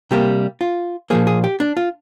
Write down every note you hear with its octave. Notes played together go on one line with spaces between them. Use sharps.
C3 G3 A#3 G4
F4
A#2 F3 A#3 G#4
G#4
G4
D4
F4